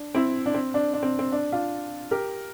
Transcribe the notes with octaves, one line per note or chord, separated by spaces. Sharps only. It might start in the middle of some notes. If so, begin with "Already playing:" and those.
Already playing: D4
C4 E4
D4
C4
D4
D4
C4
C4
D4
D4 F4
G4 A#4